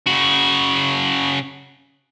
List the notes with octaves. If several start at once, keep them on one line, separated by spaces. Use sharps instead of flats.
C#3 F#4